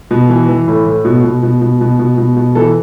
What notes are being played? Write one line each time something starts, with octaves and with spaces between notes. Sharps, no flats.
B2
E3
E3
A2
A2
B2
B2
B2
B2
B2
B2
B2
B2
E3 A4